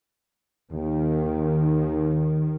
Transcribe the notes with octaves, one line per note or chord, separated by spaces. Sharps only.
D#2 D#3